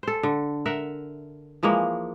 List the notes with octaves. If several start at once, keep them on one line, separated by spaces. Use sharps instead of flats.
A4 C5
D3
A#4 E5 F#5
E3 F3 G#3 A#3